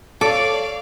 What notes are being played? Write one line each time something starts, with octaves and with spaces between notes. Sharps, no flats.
A4 C#5 D5 F5 D6